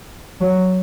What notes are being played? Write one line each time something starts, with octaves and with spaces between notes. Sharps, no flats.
F#3